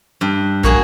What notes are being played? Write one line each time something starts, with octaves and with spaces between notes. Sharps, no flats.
G2
A#1 A#3 F#4 G#4